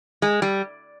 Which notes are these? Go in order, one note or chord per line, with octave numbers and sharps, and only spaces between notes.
G#3
G3